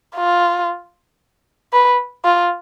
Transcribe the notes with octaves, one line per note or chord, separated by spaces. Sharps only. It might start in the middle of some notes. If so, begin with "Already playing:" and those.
F4
B4
F4